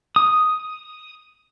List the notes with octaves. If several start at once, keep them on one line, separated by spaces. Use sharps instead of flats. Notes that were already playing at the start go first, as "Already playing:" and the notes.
D#6